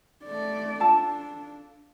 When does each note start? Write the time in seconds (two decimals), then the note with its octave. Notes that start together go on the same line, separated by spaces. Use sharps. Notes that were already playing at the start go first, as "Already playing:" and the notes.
0.25 A3 D5
0.80 D4 F4 A4 A5